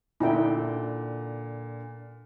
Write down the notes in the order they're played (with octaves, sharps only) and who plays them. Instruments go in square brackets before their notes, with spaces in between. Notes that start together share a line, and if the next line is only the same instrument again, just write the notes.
[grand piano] A#2 D3 [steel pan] D#4 E4 G5